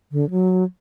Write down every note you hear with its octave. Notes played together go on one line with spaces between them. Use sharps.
D3
F#3